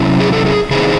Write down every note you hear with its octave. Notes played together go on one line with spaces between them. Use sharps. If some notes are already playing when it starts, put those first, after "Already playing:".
Already playing: C3 F#3 C#4 E4
G#4
A4
G#4
C#3 E3 C4 D#4 G#4